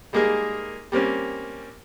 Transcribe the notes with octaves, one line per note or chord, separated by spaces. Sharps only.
G3 G#3 A#3 D#4 G#4 A#4
G3 A#3 C4 C#4